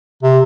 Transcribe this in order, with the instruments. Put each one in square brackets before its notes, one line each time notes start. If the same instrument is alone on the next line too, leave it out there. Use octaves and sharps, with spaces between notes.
[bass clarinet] C3